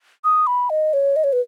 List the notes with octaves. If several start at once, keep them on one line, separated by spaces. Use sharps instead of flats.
D#6
B5
D#5
C#5
D#5
C#5
B4